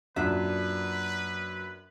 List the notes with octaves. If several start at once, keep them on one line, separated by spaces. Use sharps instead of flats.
F#2 A#2 D4 B4 E5